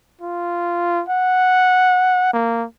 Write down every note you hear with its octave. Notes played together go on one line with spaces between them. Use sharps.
F4
F#5
A#3